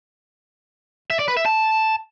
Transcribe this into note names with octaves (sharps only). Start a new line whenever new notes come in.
E5
D5
B4
E5
A5